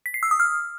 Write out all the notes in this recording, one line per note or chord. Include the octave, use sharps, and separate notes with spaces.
B6
C7
E6
D#6
F6